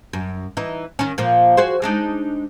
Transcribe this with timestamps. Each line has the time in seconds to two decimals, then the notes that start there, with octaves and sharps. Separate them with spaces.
0.13 F#2
0.57 E3 D#4
0.99 D#3 C#4
1.18 A#2 F3 A#3
1.57 F#4 G#4 C5
1.82 G#3 D4 D#4